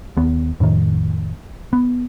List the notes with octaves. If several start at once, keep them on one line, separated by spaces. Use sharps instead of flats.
D#2 B3
F2 A2 D#3
B3